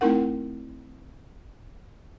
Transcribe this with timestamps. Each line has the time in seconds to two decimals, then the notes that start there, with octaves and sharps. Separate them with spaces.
0.01 A3 C4 D#4 E4 A#4 F#5